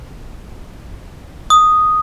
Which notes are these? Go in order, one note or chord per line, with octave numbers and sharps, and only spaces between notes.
D#6